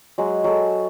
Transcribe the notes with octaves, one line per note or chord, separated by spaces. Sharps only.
F#3 G#3 F#5
F#3 A4